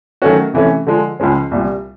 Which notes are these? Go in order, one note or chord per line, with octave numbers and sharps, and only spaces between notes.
D#3 F#3 A3 C#4 F#4
C3 E3 A3 C#4
D3 F3 G#3
C#2 C#3 F3 G#3 C#4
C2 A#2 G3